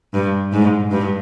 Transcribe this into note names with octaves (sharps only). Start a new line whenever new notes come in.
G2
G#2
G2